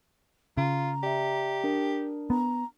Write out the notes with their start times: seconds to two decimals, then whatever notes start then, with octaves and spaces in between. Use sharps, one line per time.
0.57 C#3 F4 A#5
1.03 G4 D5 E5
1.64 D4 A#4
2.30 B3 A#5